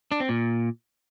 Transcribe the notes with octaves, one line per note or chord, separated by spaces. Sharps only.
D4
C4
A#2